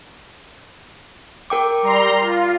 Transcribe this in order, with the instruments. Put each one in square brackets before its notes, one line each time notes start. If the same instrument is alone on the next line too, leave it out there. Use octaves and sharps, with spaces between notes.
[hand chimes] A#4 G5 D6
[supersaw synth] G3 A#5 C6
F4